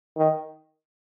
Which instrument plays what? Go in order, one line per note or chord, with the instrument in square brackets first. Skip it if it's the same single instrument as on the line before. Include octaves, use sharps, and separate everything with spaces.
[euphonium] D#3